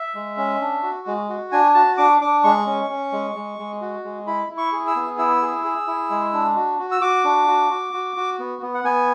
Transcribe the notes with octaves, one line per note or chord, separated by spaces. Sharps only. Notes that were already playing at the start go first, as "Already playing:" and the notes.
Already playing: E5
G#3
C#4
D4
F#4
G#3
F#4
D4 G#5
F#4 A5
D4 D6
D4 D6
G#3 C#6
C#4
C#4
G#3
G#3
G#3
F#4
G#3
E4 B5
E4
C#6
G#4
E6
B3
E4 E6
G#4
G#4
E4
G#3
D4
F#4
F#4
E6
F#4 D6
D4
F#4
F#4
F#4
F#4
B3
B3
F#5
B3 G#5